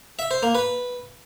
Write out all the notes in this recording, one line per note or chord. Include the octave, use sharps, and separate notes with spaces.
E5
C5
A#3
B4